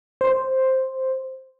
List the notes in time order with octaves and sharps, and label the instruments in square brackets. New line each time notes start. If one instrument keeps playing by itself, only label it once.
[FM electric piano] C5